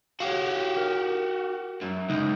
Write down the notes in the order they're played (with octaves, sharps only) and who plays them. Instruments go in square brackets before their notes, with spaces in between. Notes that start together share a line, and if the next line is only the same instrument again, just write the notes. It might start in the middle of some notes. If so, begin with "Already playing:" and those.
[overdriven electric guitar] F#4 G4 [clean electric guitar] C#5 F5
[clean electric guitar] A#4
[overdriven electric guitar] F#2
[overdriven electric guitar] C#2 [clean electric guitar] D#4